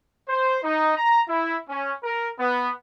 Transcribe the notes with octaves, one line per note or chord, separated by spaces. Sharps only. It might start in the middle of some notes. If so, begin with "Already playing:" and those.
C5
D#4
A#5
E4
C#4
A#4
B3